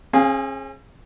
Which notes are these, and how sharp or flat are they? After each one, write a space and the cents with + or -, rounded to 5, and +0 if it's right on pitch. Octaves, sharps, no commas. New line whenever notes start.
C#4 -45 G#4 +0 F5 +0